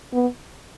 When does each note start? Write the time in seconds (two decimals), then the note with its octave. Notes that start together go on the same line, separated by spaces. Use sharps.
0.14 B3